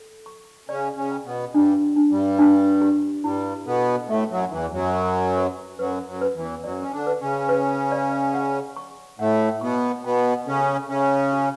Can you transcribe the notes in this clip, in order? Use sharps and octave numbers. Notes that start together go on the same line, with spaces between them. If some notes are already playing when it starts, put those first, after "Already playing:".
Already playing: A4
C#6
C#3 C#4 D5
C#3 C#4
G5
B2 B3
G2 G3 D4
D4
G2 G3
D4
G4
G2 G3 E4
B2 B3 A4
A2 A3 E5
F#2 F#3
E2 E3 E4
F#2 F#3
B5
B4
F#2 F#3 B4
F#2 F#3
B4
E2 E3
F#2 F#3 D5
C#4
D3 D4
B4
C#3 C#4
B4
D5
F#5
C#6
A2 A3 F#5
B2 B3 C#6
B2 B3 G5
C#3 C#4 A4
C#3 C#4 E5
F#4